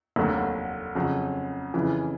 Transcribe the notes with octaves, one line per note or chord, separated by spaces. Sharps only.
F1 D#2 D3 F#3
F2 C#3 F#3
F2 C#3 E3